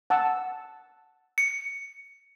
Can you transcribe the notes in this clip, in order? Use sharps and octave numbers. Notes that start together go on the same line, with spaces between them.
F#5 A5 E6
C#7